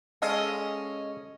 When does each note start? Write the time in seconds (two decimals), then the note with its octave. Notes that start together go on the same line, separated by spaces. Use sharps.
0.22 G#3 C#4 A4 D#5 F5